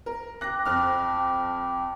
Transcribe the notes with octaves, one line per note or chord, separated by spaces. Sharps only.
A#4
G5 D6 F#6 A#6
F2 F6